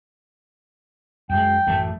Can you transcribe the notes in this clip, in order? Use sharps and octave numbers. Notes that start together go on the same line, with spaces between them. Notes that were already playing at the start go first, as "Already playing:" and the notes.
F#2 G#3 G5
A1 F#2 A3